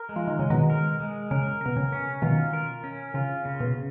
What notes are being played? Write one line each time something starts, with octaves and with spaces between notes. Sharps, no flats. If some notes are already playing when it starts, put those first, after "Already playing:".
Already playing: A#4
G#3
F3
D#3
C#3 G#3
B2 D#3
A#4
G#3
C#3 A#4
B2 A#4
C#3
C#4
B2 D#3 F4
A#4
C#4
C#3 F4
C#3
B2